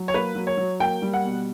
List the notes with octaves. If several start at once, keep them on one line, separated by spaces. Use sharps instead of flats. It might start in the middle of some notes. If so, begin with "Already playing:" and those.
Already playing: F#3
C#5
A#3 B4
F#3
C#5
F#3
A#3 G5
G3
F#5
B2